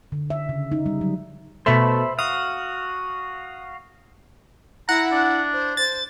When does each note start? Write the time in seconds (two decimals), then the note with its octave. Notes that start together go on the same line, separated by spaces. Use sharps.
0.12 D3
0.30 E5
0.49 C#3
0.72 D#4
0.86 G3
1.01 F#3
1.66 B2 A3 C5 E5 B5
2.19 F#4 F5 D#6
4.89 E4 F#5 A#5
5.12 D4
5.53 C5
5.77 C5 A6